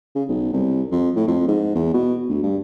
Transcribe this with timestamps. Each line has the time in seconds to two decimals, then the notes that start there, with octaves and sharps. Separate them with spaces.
0.16 C#3
0.29 B1
0.53 C2
0.91 F2
1.16 A2
1.27 F2
1.48 G#2
1.76 E2
1.94 B2
2.29 D2
2.43 G2